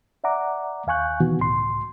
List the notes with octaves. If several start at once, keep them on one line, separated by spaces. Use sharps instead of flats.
D5 E5 F#5 A#5 D6
D#2 F5 G#5 C#6 F#6 G6
B2 D#3 E3 B3 F#4
C#2 A2 C6